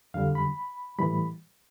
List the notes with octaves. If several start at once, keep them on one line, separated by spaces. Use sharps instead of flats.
F2 D3 G3 F5
B5
A2 E3 G3 B5